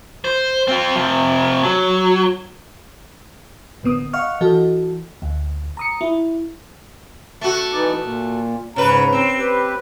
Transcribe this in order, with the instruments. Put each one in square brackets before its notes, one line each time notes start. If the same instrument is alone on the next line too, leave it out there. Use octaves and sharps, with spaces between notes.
[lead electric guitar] C5
C4 F4
C3 F3
F#3
[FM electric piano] A1 D3 B3 D#6
D#5 F5 F#5 C#6 F6
E3 F#4 A4 D#5
D2
A#5 D#6 C#7
E4
[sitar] A3 F#4
[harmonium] E3 D#4 D5
A#2
[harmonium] G#2 A#5 [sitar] C#3 B4
[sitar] C4
[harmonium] G4 B4